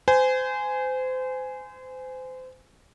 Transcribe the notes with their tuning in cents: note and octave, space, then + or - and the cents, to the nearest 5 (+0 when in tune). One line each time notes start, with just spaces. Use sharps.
C5 -30 G#5 +0